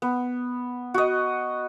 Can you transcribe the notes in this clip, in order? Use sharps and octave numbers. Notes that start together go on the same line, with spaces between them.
B3
F#4 D#5